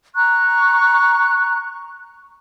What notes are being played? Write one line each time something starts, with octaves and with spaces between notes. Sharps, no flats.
A#5 C#6 F#6